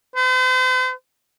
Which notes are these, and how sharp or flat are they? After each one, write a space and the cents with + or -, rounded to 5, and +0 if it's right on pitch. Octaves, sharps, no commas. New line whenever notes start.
C5 -45